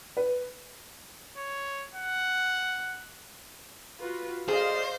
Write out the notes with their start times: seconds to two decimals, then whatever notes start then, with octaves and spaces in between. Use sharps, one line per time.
0.17 B4
1.38 C#5
1.95 F#5
4.00 F4 F#4 B4
4.48 G#4 C5 D5 D#5 F5